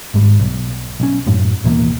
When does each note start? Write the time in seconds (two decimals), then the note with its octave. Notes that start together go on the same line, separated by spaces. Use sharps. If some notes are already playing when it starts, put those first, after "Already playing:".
0.14 G#1 G#2 G3
0.40 B1
1.00 B1 C#4
1.26 F#2 A2 F#3
1.64 D#2 B2 E3 A#3